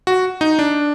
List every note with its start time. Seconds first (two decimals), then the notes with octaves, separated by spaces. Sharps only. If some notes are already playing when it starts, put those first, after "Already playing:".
0.07 F#4
0.41 D#4
0.59 D4